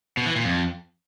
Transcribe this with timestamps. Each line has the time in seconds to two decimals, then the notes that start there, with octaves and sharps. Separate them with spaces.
0.17 B2
0.27 E3
0.36 A#2
0.45 F2